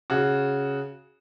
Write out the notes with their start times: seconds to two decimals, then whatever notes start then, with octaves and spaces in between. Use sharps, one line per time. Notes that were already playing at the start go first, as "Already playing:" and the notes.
0.10 C#3 F#4